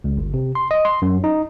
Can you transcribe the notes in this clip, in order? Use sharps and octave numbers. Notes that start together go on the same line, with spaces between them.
C#2
G1
C3
C6
D#5
C6
F#2
D#4